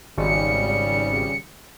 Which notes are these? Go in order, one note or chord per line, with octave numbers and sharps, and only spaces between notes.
G#1 C#3 G3 C#7